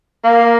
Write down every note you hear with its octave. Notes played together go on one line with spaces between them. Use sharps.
A#3 F5